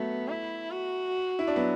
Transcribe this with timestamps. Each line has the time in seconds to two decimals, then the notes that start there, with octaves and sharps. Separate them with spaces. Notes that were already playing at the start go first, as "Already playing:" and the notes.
Already playing: F#3 A3 B3
0.29 E4
0.71 F#4
1.39 E4
1.47 D4
1.56 F#3 B3